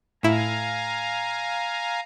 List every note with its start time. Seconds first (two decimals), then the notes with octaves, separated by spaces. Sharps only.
0.23 A2 E4 F5 G#5 A#5